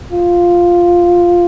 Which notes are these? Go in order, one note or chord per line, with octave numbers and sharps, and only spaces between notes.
F4